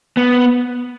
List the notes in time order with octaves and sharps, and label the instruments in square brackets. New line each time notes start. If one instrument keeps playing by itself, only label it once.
[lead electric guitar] B3